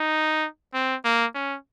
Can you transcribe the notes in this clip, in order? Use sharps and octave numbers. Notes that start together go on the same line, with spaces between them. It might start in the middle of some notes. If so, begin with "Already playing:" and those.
Already playing: D#4
C4
A#3
C#4